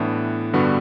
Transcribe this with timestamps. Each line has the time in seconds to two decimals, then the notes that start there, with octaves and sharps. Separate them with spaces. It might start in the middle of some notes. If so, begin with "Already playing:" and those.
Already playing: A2 E3 B3 D4
0.53 G2 D3 G3 B3 F#4